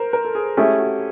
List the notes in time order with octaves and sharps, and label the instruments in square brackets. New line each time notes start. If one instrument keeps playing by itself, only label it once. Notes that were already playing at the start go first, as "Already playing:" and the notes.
Already playing: [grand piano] A#4 C5
A#4
A4
G#4
[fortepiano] A3 C#4 E4 G#4 [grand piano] G4
[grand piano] F#4